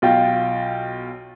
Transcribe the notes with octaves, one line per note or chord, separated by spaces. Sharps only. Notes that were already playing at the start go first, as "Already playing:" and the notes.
B1 F4 G5